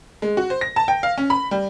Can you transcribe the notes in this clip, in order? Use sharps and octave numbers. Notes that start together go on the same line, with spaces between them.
G#3
F#4
C5
A#6
A5
G5
F5
C#4
B5
G3